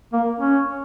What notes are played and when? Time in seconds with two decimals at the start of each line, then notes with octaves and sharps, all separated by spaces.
0.13 A#3
0.40 C#4